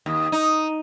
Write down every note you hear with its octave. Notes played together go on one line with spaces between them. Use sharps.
D#2
D#4